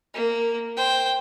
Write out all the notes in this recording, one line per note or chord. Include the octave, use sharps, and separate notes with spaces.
A#3
C5 G5